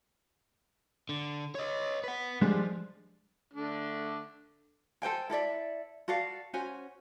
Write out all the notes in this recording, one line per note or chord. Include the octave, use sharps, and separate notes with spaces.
D3
C#5 D#5
B4 F#5
F3 G3 G#3 D4
D3 A3 D4
A4 C5 G5 G#5
E4 A4 D5 E5
F#4 A4 D5 F5
C#4 F#4 C5 G#5